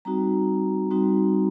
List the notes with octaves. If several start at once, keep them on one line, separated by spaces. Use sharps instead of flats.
G3 C4 D#4 F#4 A#5
G3 C4 D#4 F#4